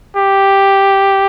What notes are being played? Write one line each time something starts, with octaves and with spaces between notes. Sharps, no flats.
G4